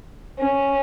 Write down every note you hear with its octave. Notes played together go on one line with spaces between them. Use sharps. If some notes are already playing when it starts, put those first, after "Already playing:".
C#4